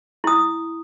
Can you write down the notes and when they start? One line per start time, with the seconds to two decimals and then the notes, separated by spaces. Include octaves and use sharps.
0.24 E4 D#6